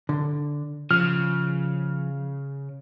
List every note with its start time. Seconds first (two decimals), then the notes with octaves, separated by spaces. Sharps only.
0.09 D3
0.91 C#3 F3 F6